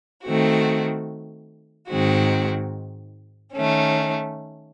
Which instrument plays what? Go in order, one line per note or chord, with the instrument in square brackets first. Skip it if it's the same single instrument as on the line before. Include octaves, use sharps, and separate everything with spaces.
[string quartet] D#3 A3 C4 F#4
G#2 D#3 G#3 C4 F#4
D#3 A3 C#4